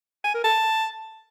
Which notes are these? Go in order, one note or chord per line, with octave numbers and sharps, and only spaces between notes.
G#5
A#4
A5